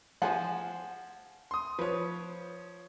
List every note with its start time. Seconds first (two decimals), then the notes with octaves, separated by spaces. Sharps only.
0.22 F3 G#4 C5 F#5
1.51 C6 D#6
1.79 F3 B4 C#5